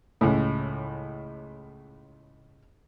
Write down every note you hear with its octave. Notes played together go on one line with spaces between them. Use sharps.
C#2 A2